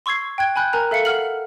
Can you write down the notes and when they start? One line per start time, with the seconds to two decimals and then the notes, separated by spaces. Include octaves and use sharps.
0.06 C6 C#6 E6 G#6 C7
0.38 G5 F#6 G#6
0.56 G#5 B5 F#6 G6
0.73 A#4 G#5 A#5 F#6
0.91 A4 E5 F5 C#7
1.05 F#5 F6 F#7